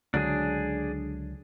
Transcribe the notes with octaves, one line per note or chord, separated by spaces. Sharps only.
C#2 D3 F#3 D4 G#4